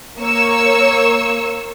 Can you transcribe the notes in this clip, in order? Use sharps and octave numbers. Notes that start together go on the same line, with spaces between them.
A#3 C#5 C#6 E6